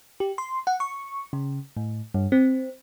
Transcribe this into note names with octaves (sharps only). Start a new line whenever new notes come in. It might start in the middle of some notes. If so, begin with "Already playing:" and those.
G4
C6
F#5
C#6
C#3
A2
G2
C4